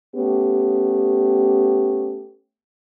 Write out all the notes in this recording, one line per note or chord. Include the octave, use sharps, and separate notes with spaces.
A3 B3 C#4 G4